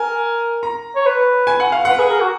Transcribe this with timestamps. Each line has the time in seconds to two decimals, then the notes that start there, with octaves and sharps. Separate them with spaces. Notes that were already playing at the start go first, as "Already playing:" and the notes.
Already playing: A#4 G#5
0.63 A#5
0.96 C#5
1.06 B4
1.47 G#5
1.60 F#5
1.72 F5
1.85 B4 F#5
1.99 G#4
2.10 A#4
2.20 F#4